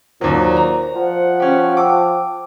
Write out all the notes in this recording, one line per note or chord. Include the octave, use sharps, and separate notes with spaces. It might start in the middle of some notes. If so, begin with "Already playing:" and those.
D#2 A#2 F#3 C5 D5
A#5
F3 F#5
C#4 G4
G5 A5 D6 E6